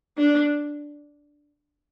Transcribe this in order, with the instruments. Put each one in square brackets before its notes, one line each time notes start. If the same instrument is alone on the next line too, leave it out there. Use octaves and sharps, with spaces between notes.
[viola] D4